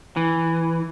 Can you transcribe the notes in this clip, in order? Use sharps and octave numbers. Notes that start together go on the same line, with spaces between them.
E3